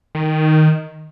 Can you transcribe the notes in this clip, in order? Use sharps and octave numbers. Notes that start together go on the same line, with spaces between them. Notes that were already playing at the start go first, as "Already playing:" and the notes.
D#3